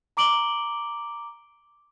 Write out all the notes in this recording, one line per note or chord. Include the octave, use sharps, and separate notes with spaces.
A#5 D6 D7 F#7 G7